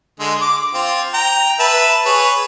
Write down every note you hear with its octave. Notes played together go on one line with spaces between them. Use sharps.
D3 G#3
D6
C4 F4
G5 A#5
B4 E5 A5
G#4 B4 C#5